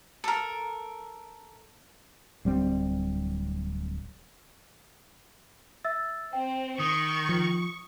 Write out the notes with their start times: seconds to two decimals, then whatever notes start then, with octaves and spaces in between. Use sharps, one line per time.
0.24 A4 A#4
2.45 D1 G3 C4
5.84 E5 E6 A6
6.33 C4 G5
6.79 D#3 C#6 D#6
7.29 F3